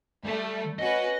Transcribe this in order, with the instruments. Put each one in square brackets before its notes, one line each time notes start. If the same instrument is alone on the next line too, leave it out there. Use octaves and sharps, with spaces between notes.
[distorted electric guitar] G3 B5 [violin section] A3
[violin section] C#4 F#4 B4 [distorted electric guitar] D#5